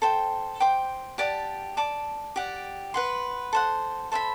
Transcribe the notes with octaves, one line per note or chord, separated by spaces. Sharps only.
A4 C5 G5
C5 G5 D6
G4 D5 F#5 A5
D5 A5 D6
G4 D5 F#5
B4 F#5 C6
A4 C5 F#5
A4 C5 E5 B5